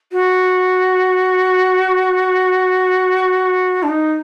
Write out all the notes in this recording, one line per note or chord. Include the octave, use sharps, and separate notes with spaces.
F#4
D4
D#4